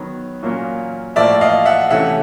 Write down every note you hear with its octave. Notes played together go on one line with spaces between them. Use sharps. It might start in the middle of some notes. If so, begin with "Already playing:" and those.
Already playing: D#3 F#3 B3
A#2 F#3 A#3 C#4
A2 F3 A#3 D5 E5
D#5 F5
E5 F#5
C3 E3 A3 C#4 E5 F#5